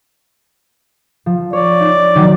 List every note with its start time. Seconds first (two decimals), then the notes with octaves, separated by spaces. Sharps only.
1.26 F3
1.53 C#5 D5
1.81 D#4
2.15 D#3 F#3